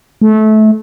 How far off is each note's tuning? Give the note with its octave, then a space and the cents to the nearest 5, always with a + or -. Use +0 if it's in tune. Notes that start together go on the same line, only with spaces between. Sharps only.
A3 -25